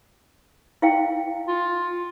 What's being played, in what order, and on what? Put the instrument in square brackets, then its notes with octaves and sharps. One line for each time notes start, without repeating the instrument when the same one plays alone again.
[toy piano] E4 F5 G5
[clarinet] F4